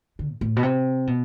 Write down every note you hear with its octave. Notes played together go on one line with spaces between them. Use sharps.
D3
G#2
A2
B2
C3
B2